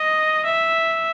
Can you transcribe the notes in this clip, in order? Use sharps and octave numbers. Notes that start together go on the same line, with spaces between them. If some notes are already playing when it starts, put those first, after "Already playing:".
Already playing: D#5
E5